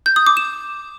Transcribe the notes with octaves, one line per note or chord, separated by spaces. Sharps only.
G6
D#6
D6
E7